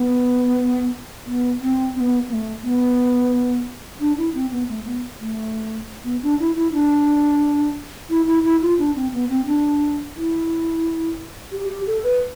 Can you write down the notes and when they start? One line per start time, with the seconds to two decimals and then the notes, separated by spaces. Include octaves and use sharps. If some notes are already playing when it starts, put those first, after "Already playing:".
Already playing: B3
1.26 B3
1.61 C4
1.95 C4
2.00 B3
2.29 B3
2.33 A3
2.63 B3
4.00 D4
4.18 E4
4.34 C4
4.52 B3
4.69 A3
4.86 B3
5.20 A3
6.05 B3
6.23 D4
6.40 E4
6.56 E4
6.73 D4
8.10 E4
8.27 E4
8.44 E4
8.62 F4
8.79 D4
8.96 C4
9.13 B3
9.29 C4
9.46 D4
10.16 E4
11.52 G4
11.69 G4
11.87 A4
12.04 B4